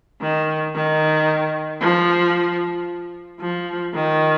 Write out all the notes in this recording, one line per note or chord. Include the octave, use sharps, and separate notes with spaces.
D#3
D#3
F3
F3
D#3